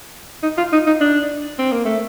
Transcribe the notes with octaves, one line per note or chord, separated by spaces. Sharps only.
D#4
F4
D#4
D#4
D4
C4
A#3
A3